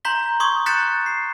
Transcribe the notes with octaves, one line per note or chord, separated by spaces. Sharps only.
A#5 C6 G6 B6 G7
C6 C#6 D#6 G#6
F#6 G6 A6 B6 C#7 E7
C7